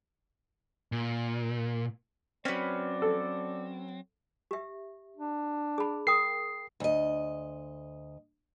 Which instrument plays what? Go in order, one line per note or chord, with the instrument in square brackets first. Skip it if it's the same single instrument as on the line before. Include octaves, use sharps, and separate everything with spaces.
[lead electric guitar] A#2
[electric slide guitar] F#3 C4 [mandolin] C#4 B4 [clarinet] D5
[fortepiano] A4
[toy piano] G4 E5
[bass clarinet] D4
[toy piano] G#4 B5
[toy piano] A#4 G5 D#6 [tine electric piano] C7
[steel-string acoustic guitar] D2 D#5